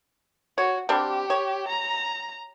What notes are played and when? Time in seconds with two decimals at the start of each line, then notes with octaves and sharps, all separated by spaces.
0.58 F#4 C#5
0.89 G3 C4 D4 G4
1.30 C#5
1.68 A#5